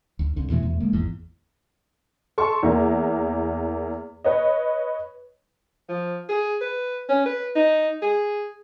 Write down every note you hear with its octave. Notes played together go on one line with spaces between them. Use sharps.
D2
C2 D3
E2 B2 E3 A3
E2 A3
D3 G#3 A#3
G#1 E2
A4 C6 C#6
E2 A#3
B4 C#5 D#5
F3
G#4
B4
C#4
B4
D#4
G#4